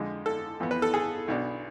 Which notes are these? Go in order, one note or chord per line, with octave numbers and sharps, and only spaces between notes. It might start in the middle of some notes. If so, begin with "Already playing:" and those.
Already playing: F2 D3 G#3
A4
F2 E3 B3
B4
A4
G#4
B1 B2 B3 D4